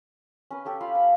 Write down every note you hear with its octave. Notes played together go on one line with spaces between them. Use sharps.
C#4 B4
G4 A4 C#5
F4 F5 B5
B5